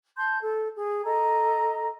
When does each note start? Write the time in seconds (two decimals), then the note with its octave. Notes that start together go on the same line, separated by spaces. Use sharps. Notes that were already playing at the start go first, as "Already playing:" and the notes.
0.17 A5 C6 G6
0.41 A4
0.76 G#4
1.04 A4 D#5 A#5